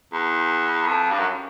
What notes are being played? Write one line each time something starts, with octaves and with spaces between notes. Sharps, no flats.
E2
F2
G2
F#2